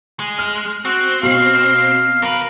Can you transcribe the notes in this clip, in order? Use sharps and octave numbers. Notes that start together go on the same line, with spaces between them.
G#3
F6
C4 F#4
B2 F5
D#2 A#4 B4